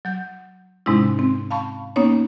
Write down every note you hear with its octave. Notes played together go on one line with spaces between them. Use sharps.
F#3 G6
G#2 C3 G#3 C#4 D#4 E4
C4
F5 A5 B5 C#6
A#3 B3 C#4 D#4 C#5